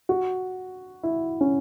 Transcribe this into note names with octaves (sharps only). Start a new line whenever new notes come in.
F#4
E4
C#4